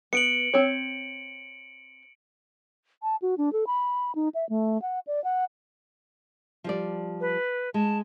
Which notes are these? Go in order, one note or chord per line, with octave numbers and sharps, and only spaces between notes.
B3 C#7 D7 F#7
C4 C#5
A5
F#4
D4
A4
B5
D#4
E5
A3
F#5
D5
F#5
F3 G3 D5
B4
G#3 A5